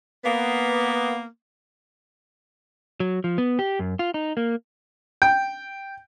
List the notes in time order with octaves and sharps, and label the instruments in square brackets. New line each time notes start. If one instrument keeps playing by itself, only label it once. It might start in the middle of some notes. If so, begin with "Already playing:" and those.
[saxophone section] A#3 B3
[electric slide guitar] F#3
F3
B3
G4
F#2
F4
D#4
A#3
[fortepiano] G5